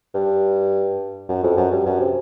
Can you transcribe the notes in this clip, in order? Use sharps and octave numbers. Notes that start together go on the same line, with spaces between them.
G2
F#2
F2
F#2
G2
F#2
C3